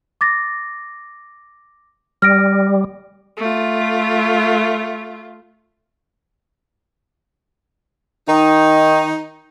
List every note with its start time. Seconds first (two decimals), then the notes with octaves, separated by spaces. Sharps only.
0.21 D6 A6 A#6
2.22 G3 F6 A#6 D7
3.37 A3 F4
8.28 D#3 D#4